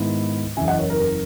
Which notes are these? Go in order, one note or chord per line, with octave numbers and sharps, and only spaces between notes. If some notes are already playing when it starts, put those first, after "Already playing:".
Already playing: G#2 D#3 G#3 B3 E4
F#1 E2 C#3 E5 G#5
D#5 F#5
A#4 C#5
A#4
A#4